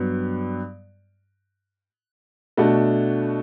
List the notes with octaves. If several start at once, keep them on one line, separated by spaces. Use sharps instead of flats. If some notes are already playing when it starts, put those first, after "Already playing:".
Already playing: G2 F#3 B3
B2 A3 D4 F#4